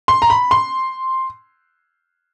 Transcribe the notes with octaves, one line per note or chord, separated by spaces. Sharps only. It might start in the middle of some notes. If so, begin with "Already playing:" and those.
C6
A#5
B5
C6